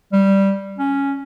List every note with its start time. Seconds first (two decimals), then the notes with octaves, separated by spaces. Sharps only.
0.13 G3
0.78 C#4